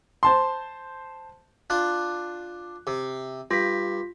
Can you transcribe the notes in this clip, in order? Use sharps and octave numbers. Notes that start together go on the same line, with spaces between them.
C5 A5 C6
D4 F4 F#6
C3
G2 F4 B6